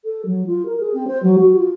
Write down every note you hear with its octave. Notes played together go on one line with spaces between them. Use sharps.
A4
F#3
F4
A#4
G#4
C4
C5
F#3
F#4
F4